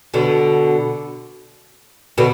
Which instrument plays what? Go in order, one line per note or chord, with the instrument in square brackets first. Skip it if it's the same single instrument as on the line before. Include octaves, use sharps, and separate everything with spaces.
[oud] B2 D3
B2 D3